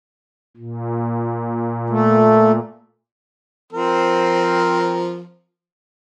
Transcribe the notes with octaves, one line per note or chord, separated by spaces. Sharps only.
A#2
A3
F3 C4 A#4